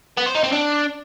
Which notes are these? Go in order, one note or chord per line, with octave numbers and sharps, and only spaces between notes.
B3
C5
D#4
C4
D4